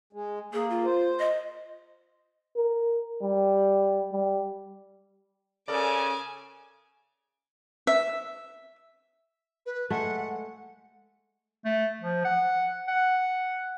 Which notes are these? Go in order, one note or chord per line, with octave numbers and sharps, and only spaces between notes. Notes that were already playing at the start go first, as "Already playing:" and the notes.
G#3
A#3 G#4
F4
C5
D#5
A#4
G3
G3
C#3 A4 A#4 D5 G#5 D6
E5
B4
G#3 A3 F#5
A3
F3
F#5
F#5